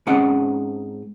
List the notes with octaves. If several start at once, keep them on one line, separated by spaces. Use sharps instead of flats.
G#2 C4 C#4 D#5 F#5